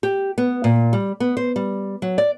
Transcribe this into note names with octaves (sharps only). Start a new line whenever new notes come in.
G4
B3
A#2
G3
B3
C5
G3
F#3
D5